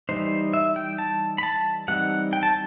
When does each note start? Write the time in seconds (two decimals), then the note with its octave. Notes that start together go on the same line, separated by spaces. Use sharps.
0.09 E3 G3 D#4 C5
0.53 E5
0.76 G5
0.98 A5
1.38 B5
1.43 A5
1.88 E3 G3 C4 D#4 F#5
2.33 G5
2.43 A5